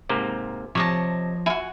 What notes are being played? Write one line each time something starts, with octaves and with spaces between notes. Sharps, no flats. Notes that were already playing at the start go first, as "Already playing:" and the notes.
G#2 C3 A#3
C3 F3 C#5 D#5 A5
E4 F#4 G#5